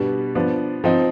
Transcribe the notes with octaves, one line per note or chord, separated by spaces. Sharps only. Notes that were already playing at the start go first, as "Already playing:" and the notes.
Already playing: B2 G3 B3 D4
F3 B3 D4
F3 C4 D#4